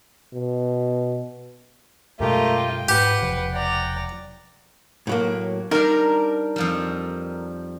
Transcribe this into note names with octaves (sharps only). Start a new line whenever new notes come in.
B2
F#2 B2 G#3 A3 F4 G4 A#4 D#5
G5
G#2 G4 B4 F#5
E1 C3 F3
D5 F#5 G5 A#5
A2 F#3 A#3
G3 D4 D#4 A#4
F2 F3 G3